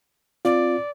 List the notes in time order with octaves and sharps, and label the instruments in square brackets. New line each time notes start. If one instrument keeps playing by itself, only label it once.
[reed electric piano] C4 F4 [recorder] D5